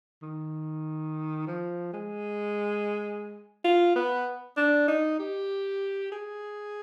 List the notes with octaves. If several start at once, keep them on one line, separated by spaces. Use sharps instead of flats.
D#3
F3
G#3
F4
B3
D4
D#4
G4
G#4